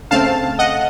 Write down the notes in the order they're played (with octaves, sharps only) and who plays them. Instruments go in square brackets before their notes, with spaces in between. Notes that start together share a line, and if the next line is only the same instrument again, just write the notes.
[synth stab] C#3 A3 C4 F5 A5
D#5 F#5